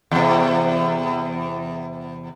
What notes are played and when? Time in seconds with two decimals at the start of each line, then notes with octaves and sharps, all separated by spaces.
0.11 E2 C3